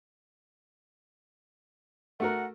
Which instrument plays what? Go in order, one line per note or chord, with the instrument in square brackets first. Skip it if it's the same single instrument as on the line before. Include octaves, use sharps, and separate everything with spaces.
[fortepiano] A3 F#4 A#4 [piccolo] F#5